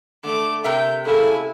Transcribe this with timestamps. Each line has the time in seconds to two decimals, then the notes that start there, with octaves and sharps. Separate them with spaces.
0.24 D3 A3 D6
0.64 C3 A#4 E5 G5
1.05 A2 C#3 A#3 E4 A4 G#5